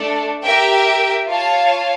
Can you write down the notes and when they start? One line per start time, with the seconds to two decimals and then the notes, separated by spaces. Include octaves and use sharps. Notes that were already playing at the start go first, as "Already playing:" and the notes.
Already playing: A3 D4 A4
0.43 G4 A#4 E5 G5
1.28 F4 C#5 F5 A5